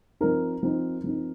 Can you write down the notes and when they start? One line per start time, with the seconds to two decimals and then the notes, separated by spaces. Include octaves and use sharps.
0.20 F3 C4 D#4 A#4
0.63 F3 C4 D#4
1.04 F3 C4 D#4